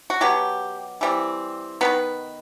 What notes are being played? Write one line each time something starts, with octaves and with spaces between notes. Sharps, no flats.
F#4
B2 F#3 B3 G4
E3 G3 C4
D#3 G3 B3 B4